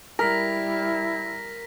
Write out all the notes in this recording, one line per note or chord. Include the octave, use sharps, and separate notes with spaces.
G3 E4 A#4 A#6 B6